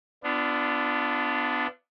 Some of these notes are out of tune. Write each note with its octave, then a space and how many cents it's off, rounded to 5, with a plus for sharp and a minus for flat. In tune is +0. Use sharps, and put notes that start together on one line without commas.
B3 +20 D4 +0 F4 -30